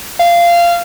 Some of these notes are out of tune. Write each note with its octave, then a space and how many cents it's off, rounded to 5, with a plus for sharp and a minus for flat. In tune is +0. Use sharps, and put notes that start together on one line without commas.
F5 -20